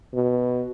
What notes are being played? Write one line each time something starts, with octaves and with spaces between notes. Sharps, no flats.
B2